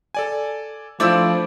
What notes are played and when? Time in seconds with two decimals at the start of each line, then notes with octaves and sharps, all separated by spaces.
0.15 A4 D5 G#5
1.00 F3 A3 D4 E4 C5 D5 D6 E6